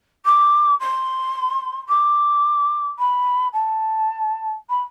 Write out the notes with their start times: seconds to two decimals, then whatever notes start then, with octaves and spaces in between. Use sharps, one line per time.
0.25 D6
0.80 C6
1.88 D6
2.98 B5
3.52 A5
4.69 B5